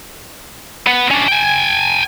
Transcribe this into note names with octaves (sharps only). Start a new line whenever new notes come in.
B3
C#4 D4
G5 G#5